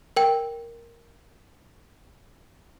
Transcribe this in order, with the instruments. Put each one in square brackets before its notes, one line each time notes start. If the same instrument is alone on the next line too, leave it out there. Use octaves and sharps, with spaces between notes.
[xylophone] A#4 G5